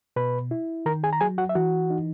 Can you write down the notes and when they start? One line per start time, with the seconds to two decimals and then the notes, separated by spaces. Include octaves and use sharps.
0.16 B2 B4 B5
0.51 E4
0.86 D#3 A#4 A#5
1.03 G#4 G#5
1.13 A#5
1.21 F#3 G#4 G#5
1.38 F#4 F#5
1.49 E5
1.55 E3 F#4 F#5
1.90 D#4